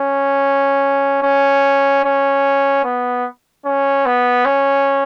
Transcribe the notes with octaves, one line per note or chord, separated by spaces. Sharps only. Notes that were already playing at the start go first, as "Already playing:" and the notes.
Already playing: C#4
C#4
C#4
B3
C#4
B3
C#4